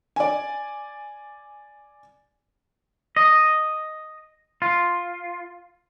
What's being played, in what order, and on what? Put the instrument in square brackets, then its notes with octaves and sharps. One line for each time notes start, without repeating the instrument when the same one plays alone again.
[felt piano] D5 G#5
[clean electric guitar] D#5
F4